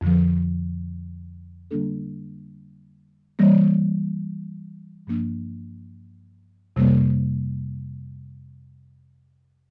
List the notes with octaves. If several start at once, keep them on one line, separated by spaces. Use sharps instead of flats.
F2 D3 F3
D3 G3 A#3 D4 A4
E3 G3 A#3
G2 F3 A#3 D4
F2 C3 G3 A#3